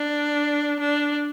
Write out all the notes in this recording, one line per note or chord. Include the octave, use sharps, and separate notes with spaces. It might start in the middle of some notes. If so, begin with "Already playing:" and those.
Already playing: D4
D4